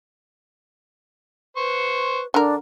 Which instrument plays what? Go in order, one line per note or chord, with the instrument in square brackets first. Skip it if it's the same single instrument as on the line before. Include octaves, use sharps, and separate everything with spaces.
[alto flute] B4 [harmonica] C5 C#6
[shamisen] D3 A#4 [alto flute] D4